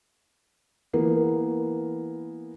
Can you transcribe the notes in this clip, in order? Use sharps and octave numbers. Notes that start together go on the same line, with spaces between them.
E3 A#3 B3